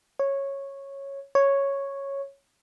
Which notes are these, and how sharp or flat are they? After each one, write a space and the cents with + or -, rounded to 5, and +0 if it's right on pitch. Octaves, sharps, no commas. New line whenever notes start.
C#5 -10
C#5 -5